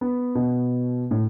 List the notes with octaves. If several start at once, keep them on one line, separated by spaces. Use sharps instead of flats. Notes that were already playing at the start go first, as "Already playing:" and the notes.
B3
B2
A2